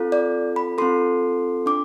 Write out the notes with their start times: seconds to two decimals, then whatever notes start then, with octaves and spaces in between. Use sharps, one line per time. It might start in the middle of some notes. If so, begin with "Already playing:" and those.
Already playing: C4 F4 A4
0.12 D5
0.56 B5
0.78 C4 F4 A4 C6
1.66 D4 D6